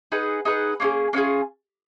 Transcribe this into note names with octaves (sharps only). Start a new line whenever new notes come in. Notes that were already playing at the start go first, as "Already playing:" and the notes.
D#4 G#4 B4 F#5
D#4 G#4 B4 F#5
A#3 C#4 F4 G#4
A#3 C#4 F4 G#4